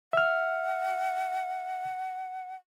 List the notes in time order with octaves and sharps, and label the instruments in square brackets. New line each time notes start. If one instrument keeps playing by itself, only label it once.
[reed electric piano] E5 F6 [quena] F#5